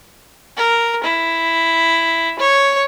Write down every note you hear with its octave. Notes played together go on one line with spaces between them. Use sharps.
A#4
E4
C#5